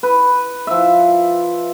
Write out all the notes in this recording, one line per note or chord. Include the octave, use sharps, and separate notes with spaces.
B4
F3 E5